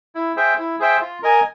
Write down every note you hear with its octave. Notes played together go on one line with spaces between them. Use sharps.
E4
G#4 C5 E5 G5
E4
G#4 C5 E5 G5
F4
A#4 D#5 G#5